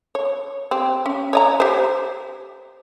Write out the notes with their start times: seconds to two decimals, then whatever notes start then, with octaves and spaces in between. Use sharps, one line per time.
0.15 C#5
0.71 C4 G4
1.06 C#4
1.33 C#5 D#5 A#5
1.60 G4 C5